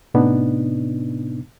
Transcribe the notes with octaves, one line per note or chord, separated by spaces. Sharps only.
A2 C3 B3 D4 D#4